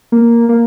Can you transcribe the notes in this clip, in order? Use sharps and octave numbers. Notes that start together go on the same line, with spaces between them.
A#3
A#3